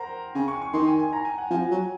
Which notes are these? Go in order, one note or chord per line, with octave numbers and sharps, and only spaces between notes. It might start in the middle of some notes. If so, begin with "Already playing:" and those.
Already playing: A#4 C5 F#5 A#5
C#3 G#5
C#6
C#6
D#3 C6
G#5
G#5
A#5
G#5
F#5
F3 G#5
F#3